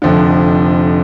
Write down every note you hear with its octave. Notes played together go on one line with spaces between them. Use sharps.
F1 F2 D3